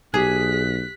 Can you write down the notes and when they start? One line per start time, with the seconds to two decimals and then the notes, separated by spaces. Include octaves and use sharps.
0.14 B1 G4 G#4 F#6 G#6 B6